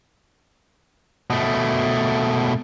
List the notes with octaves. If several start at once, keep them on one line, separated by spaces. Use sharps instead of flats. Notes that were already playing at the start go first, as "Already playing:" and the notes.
B2 A3